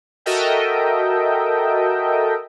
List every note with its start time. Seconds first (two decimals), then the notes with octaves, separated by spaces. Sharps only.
0.26 F#4 A4 A#4 D#5 E5 G5